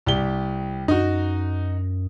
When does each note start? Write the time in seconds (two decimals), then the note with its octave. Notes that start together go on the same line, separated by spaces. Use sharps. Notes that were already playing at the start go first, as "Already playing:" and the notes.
0.07 C2 G4 G7
0.88 F#2 D#4 F#4